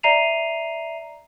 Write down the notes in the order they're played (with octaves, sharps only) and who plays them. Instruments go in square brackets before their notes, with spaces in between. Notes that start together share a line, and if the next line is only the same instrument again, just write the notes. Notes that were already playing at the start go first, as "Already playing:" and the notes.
[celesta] D5 E5 A#5 C7 D#7 F7